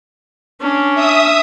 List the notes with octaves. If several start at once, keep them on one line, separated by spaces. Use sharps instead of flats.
C#4 D4
E5 D#6